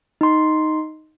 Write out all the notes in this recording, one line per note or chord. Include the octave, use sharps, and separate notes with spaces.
D#4 C6